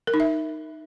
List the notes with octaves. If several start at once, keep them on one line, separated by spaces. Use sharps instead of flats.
A#4
D#4
E5